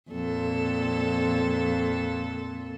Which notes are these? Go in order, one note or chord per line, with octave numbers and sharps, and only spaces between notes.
F2 A#2 A4